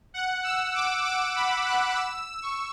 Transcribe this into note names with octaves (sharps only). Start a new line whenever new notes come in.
F#5
E6
D6
D6
B5
F#6
E6
C#6